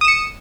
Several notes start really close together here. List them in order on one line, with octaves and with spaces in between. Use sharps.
D#6 E7 C#7